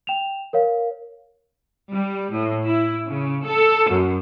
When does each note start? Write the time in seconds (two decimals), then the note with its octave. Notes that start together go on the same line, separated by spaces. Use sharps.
0.07 G5 E7 F7
0.53 A#4 C#5 F5
1.91 G3
2.31 A2
2.66 E4
3.07 C#3
3.45 A4
3.89 F#2